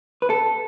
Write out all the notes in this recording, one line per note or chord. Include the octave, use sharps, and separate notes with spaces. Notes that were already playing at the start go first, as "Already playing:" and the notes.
B4
A4